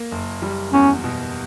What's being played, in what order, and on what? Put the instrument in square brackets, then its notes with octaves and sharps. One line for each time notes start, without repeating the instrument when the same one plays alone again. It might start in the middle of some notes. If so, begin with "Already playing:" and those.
Already playing: [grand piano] A#3
F#1
G3
[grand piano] E2 [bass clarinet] C#4
[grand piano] B2